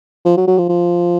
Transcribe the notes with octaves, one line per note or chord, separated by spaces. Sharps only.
F3
F#3
F#3
F3
F3